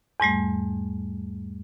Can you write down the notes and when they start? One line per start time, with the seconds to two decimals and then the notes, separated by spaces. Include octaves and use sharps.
0.20 E2 G#2 G3 A3